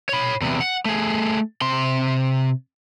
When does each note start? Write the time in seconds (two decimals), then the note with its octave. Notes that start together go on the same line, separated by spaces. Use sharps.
0.09 C#5 B5
0.42 E2 C3
0.61 F#5
0.85 A3 G#4
1.61 C3 C6